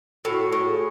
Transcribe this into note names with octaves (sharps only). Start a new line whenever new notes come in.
A2 F#4
A2
G#4